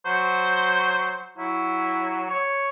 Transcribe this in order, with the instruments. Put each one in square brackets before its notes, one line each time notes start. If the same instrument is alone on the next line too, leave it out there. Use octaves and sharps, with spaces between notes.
[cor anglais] F#3 [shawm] C5
[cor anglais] F#3 [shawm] E4
[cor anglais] C#5